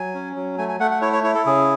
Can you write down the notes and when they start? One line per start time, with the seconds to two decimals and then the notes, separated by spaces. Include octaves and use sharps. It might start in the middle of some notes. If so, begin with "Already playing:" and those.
Already playing: F#3 G#5
0.15 C#4
0.36 F#3
0.58 A3 G#5
0.69 G#5
0.80 A3 F#5
0.91 F#5
1.02 E4 C#5
1.13 C#5
1.23 E4 C#5
1.35 A4
1.46 C#3 G#4